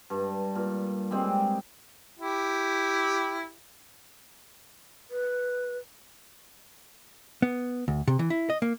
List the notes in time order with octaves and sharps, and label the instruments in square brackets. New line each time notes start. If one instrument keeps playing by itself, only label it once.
[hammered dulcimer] G2
A#2
G3 G#3 C4
[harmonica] E4 G4
[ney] B4
[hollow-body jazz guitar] B3
D2
C3
E3
E4
D#5
A#3